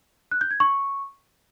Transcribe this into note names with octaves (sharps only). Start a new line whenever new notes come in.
F#6
G6
G#6
C#6